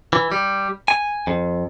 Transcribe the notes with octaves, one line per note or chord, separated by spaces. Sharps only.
E3
G3
G#5
F2